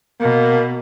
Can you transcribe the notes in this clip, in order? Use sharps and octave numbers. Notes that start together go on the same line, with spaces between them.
B2 A#3